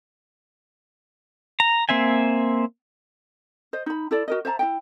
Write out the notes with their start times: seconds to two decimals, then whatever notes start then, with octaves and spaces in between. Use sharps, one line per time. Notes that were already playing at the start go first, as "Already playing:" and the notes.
1.60 A#5
1.89 A#3 C4 E5 G#5
3.73 C5 D#5
3.86 D#4 B5
4.11 E4 A4 D5
4.28 F#4 A#4 D#5
4.45 C5 E5 A5 A#5
4.59 E4 D#5 G5